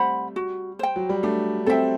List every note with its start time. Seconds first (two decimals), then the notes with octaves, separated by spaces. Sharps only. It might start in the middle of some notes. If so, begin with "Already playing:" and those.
Already playing: G3 A3 C4 C5 F#5 B5
0.36 F#4
0.79 C5 G5
0.96 F#3
1.09 G3
1.23 A3 D4
1.66 C4 A4 E5 G5